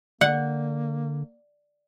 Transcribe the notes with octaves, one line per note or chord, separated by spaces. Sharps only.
D3 A#3 D5 F#5